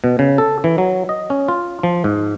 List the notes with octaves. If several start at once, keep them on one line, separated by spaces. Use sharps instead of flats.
B2
C#3
A4
E3
F#3
D#5
C#4
F4
F3
G#2